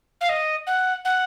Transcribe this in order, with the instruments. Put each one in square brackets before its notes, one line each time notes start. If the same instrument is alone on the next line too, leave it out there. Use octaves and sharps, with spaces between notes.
[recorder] F5
D#5
F#5
F#5